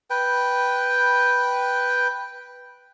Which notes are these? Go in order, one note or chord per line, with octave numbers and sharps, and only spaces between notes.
B4 G5